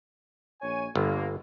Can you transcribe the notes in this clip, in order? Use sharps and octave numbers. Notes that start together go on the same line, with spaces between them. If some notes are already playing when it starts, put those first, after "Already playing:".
A#1 C#5 G#5
G1 D3 A#3